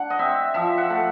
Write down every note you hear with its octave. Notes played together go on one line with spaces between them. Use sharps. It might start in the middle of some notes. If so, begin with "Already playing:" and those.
Already playing: D4 F#5
D#5
C4 E5
F3 E5
F#5
A3